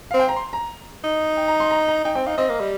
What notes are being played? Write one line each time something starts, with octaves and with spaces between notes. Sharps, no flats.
C4 F5
G5
A#5
C6
A#5
D#4
G5
A#5
C6
A#5
A#5
D#4 G5
C4 G5
D#4 F5
C4 D#5
A#3
G3